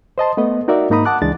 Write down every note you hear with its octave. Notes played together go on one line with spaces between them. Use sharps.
C5 D#5 A5 C6
A3 B3 B4 D#5
D#4 F#4 A#4 D5 E5
G#2 A#3 D#4 A#5 B5 D#6
F#5 A5 D6 F#6
C#2 E3 G#3 D4 A6